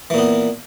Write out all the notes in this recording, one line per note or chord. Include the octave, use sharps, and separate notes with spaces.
A#2 E3 B3